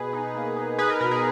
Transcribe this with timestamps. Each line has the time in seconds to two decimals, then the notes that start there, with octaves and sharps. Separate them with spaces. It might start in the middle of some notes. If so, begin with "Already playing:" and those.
Already playing: B2 G#4 B4
0.13 D#4
0.34 A#3
0.56 D#4
0.78 D#4 G#4 B4
0.90 A#4
1.01 B2 A#4
1.11 G#4